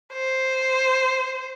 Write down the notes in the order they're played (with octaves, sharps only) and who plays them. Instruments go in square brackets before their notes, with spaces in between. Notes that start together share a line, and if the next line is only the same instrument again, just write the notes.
[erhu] C5